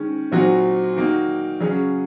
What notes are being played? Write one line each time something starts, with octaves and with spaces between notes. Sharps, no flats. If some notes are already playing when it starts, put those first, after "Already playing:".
Already playing: D#3 G#3 C#4
A#2 F#3 C4 D#4 F#4
D#3 A#3 D#4 F#4
C#3 F#3 C#4 G#4